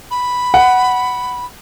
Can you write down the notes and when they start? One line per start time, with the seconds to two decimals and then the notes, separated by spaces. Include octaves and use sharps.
0.11 B5
0.54 F#5